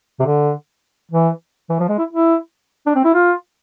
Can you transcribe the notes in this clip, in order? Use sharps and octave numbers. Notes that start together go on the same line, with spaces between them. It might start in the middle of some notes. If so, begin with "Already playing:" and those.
C3
D3
E3
E3
F3
G#3
E4
E4
D4
C4
E4
F4